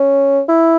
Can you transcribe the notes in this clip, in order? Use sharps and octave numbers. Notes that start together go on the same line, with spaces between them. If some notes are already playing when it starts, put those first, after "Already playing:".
Already playing: C#4
E4